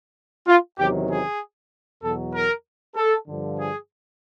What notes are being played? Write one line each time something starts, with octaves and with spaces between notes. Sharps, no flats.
F4
E2 C3 D#3 F#3 G4
G#4
E2 B2 F#3 A4
A#4
A4
G2 D3 F3
G#4